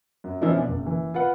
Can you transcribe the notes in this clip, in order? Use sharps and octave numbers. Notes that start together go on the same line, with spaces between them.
F#2
E3 F3 A#3 C#4 D#4 E4
B2 D4
F#1
E3
F4 B4 F#5